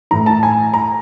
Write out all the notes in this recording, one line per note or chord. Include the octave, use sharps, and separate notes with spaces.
A2 E3 A#5
A5
G#5
A#5